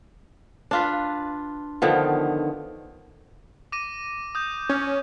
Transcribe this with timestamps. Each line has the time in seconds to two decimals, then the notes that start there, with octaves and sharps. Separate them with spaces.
0.71 D4 F4 B4
1.82 D3 D#3 F3 B3
3.72 D6 A#6 D#7
4.35 D#6 G6
4.69 C#4